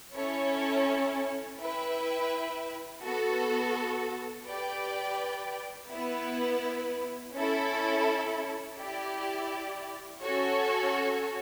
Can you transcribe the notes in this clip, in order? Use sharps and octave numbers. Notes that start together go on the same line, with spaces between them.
C#4 E4 A4 C#5
E4 B4 E5 G5
B3 F#4 A4
G4 B4 D5 G5
B3 E4 B4
C#4 E4 A4
E4 G4 D5
C#4 F#4 A4 C#5